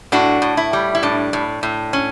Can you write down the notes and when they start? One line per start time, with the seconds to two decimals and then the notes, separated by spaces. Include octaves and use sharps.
0.12 A2 D4 F#4
0.42 A2
0.57 E4
0.73 G3
0.95 E4
1.03 A2 D4
1.33 A2
1.63 A2
1.93 C#4